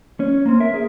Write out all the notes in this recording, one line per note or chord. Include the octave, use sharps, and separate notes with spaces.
C#4
A#3 C4
A#4 E5
G#4